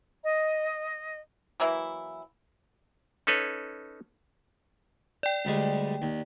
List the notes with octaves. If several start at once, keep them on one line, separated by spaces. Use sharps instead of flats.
D#5
E3 F#3 A#3 E4
C#4 D#4 A4 B4 C#5
D5 G5
D2 G3 G#3
D#2